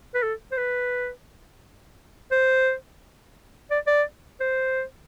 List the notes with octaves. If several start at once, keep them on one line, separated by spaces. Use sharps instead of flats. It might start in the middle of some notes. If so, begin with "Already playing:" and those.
B4
A4
C5
B4
C5
D5
D5
C5